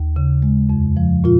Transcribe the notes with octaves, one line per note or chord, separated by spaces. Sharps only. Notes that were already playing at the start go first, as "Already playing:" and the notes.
Already playing: D#2
C#3
G#3
F2
F3
A#2 F4